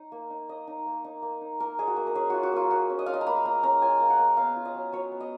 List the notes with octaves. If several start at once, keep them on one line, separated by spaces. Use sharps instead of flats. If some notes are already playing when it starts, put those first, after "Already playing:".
Already playing: D#4
A#3
D#4
A#3 D#5
D#4
A#3
D#4
A#3
D#4
A#3 A#4
D#4 G#4
F#4
A#3
A#4
C#4 G#4
F4 F#4
F#4
A#3 F4
A#3 F#4
C#4
D#5
F4 F5
D#5
A#5
A#3 B5
A#3 A#5
C#4 A#5
F4 G#5
A#3
F#5
A#3
B3 F5
F4
D#5
F#3
F#3 C#5
B3
D#5